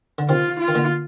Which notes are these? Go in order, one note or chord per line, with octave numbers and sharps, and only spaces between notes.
D3
C3 D#3 F4
F4
D#3
A#2 D3